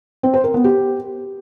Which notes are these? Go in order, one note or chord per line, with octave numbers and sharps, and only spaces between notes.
C4
C5
A#4
B3
G4